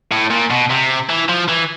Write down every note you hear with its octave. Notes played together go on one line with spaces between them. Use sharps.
A2
A#2
B2
C3
E3
F3
E3